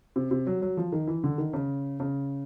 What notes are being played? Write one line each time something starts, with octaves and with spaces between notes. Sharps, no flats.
C3
C3
F#3
F#3
F3
D#3
E3
D3
D#3
C#3
C#3